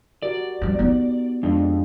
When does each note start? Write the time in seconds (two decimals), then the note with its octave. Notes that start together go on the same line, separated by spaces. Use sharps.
0.22 F#4 G4 A#4 D5
0.62 G2 F3
0.79 B3 D#4
1.43 F2 G#3 D4